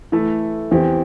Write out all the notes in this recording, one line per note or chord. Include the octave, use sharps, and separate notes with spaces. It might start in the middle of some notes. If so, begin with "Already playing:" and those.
E3 A3 E4 A4
E2 E3 C4 G4